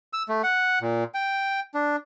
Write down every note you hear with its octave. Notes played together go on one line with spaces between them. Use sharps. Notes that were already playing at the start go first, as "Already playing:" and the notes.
E6
A3
F#5
A#2
G5
D4